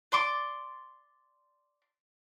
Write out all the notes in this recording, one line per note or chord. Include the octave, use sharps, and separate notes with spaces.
D5 C6 D6